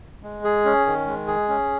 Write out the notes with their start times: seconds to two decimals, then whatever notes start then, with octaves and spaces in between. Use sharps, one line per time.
0.23 G#3
0.44 G#4
0.65 C#4
0.86 D#3
1.07 G#3
1.27 G#4
1.49 C#4